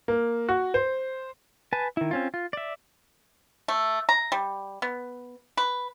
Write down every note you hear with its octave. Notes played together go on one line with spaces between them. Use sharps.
A#3
F#4
C5
B4 G#5 A5
D#3 E4
C4 C#4 F4
F4
D5 E5
A3
A#5
G3
B3
B4